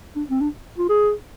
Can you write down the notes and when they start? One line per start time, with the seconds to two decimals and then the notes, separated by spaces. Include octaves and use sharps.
0.16 D4
0.30 C4
0.41 D4
0.78 F4
0.89 G#4